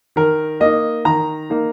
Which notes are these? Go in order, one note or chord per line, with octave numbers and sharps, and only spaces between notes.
D#3 A#4
A#3 D#4 D#5
D#3 A#5
A#3 D#4